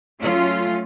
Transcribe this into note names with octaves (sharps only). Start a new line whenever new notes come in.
F#3 A3 C#4 F4